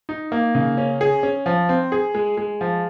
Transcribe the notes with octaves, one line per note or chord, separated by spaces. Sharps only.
D#4
A#3
C#3
C#4
G#4
C#4
F3
C4
G#4
G#3
G#3
F3